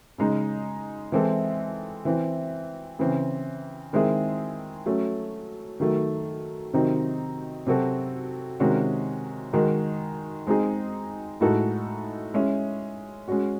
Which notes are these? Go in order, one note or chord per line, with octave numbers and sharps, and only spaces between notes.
C#3 G#3 D#4
E3 G#3 C4 E4 A4
E3 C4 E4
C#3 E3 C4
D#3 G#3 C4 E4 G#4
F#3 A3 C#4
D#3 F#3 A3
C3 D#3 F#3 C4 D#4
C3 F#3 C4 F#4 A4
C3 D#3 G#3 C#4 F#4
D#3 G#3 D#4 F#4
G#3 C4 D#4 G#4
A2 G#3 D#4 F#4 A4
G#3 C#4 E4
G#3 C#4 F#4